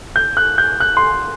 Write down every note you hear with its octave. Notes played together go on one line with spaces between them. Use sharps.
G6
F#6
G6
F#6
C6